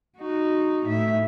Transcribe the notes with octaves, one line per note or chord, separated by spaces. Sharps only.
D#4 F#4
A2 E5